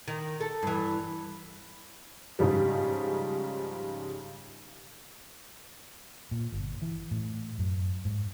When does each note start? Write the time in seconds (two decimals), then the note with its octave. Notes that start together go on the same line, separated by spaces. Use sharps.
0.08 D#3
0.41 A4
0.63 G2 E3
2.39 G#2 C#3 F3 G3
6.31 A#2
6.52 G1
6.82 E3
7.11 A2
7.58 F#2
8.05 G#2